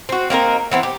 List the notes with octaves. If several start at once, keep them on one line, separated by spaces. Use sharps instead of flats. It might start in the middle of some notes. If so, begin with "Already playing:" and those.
C4 F#4
A#3 C4 D#4 A#4
E3 B3 C4
G4